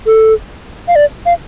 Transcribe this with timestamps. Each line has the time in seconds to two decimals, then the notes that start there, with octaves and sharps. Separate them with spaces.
0.06 A4
0.88 F5
0.96 D5
1.26 F5